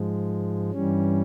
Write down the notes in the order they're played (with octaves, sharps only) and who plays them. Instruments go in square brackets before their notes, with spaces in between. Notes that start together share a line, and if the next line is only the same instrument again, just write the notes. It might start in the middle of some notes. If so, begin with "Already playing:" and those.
Already playing: [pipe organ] G#2 F3 G#3
G2 E3 G3 C#4